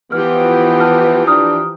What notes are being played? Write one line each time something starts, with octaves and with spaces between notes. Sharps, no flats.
E3 F3 B3 G4 F6
A5 F6
D4 A#5 D#6 F6